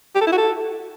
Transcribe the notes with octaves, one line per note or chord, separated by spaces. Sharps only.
G4
A4
E4
F#4
A4